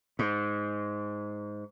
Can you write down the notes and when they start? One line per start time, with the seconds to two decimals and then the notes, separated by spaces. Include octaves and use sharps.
0.19 G#2